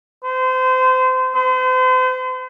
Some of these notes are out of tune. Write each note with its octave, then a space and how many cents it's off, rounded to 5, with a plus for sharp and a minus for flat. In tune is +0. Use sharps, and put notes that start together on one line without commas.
C5 -30
C5 -40